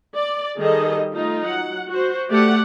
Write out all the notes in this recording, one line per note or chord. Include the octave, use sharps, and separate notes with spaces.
D5
D#3 G3 G#4 A4 D#5
A3 D#4 F4
F#3 F#5
F#4 C5
A3 G4 D5 F#5